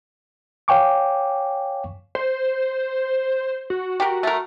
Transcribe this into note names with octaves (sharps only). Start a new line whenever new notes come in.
C#5 F5 G5 G#5 C#6 D6
C5
F#4
F#4 G4 A#4
A3 A#4